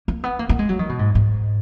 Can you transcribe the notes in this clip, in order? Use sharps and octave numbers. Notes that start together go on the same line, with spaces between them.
A#3
B3
A#3
A#3
G#3
F#3
D#3
B2
G#2
G#2